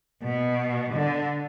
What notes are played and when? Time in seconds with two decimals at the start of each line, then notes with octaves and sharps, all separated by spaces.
0.23 B2
0.94 D3